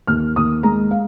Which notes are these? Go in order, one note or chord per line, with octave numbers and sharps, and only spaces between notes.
D#2 F6
D#2 D#6
G#3 A#5
F5